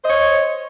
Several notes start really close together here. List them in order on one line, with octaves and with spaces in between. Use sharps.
C5 D#5 C#5